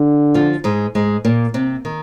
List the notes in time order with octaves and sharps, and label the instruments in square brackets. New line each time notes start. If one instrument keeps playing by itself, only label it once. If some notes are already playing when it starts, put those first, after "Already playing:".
Already playing: [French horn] D3
[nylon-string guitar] F3 F4
G#2 G#3
G#2 G#3
A#2 A#3
C3 C4
D#3